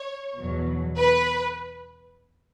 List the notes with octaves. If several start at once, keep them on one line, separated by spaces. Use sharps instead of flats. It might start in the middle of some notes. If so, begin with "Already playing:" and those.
Already playing: C#5
E2 B2 F#3
B4